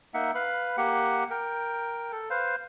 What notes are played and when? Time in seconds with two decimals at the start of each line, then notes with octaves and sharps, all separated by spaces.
0.14 A#3 D#4 E5 F#5
0.35 B4 F5 B5
0.77 A#3 G4 F#5
1.31 A#4 G5
2.12 A4
2.30 B4 C5 F5